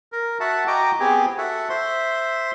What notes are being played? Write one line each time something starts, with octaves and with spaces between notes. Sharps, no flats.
A#4
F#4 E5 F#5 A5
F#4 D#5 G5 A#5 D6
B3 C4 G4 G#4 G5 G#5
F#4 A4 E5 F#5
C5 E5 C6